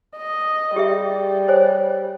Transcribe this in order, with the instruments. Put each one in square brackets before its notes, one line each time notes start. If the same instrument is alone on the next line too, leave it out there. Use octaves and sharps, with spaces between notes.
[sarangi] D#5
[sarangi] G3 [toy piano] G4 G#4 E5
[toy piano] C5 C#5 G#5